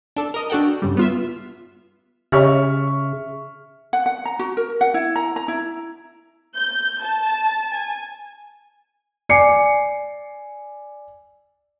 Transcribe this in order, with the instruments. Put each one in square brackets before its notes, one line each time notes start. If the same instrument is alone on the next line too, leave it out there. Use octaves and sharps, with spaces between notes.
[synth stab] D4 A4
A#4 D#5
D4 F#4 A4 F#5 G5
G2 C#3 G3
B3 F4 E5
[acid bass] C#3 [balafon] G4 C#5 D#5 [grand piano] E5 C#6 F6
[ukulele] F#5
F#5
A#5
F#4
A#4
F#5
E4
A#5
A#5
E4
[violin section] G6
A5
G#5
[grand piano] D5 G#5 D6 C7 C#7